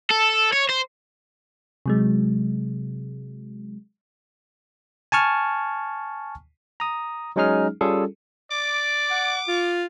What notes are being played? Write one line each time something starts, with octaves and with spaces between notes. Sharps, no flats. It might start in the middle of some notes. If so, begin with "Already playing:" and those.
A4
C#5
C5
C3 F#3 G#3
G#5 A5 C#6 F6
A#5 D#6
F#3 G#3 C#4 D#4 G#4 F6
G3 C#4 F4 G#4 A4
D5 D6
F#5
F4